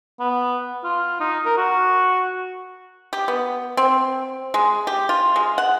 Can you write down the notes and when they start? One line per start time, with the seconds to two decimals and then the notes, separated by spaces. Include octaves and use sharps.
0.20 B3
0.84 F4
1.20 D#4
1.45 A#4
1.57 F#4
3.13 G4
3.28 B3
3.77 C4
4.54 G#3
4.87 G4
5.09 F4
5.36 G#3
5.58 F#5